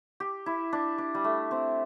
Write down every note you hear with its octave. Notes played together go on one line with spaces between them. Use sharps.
G4
E4
D4
D4
G3
A3
C4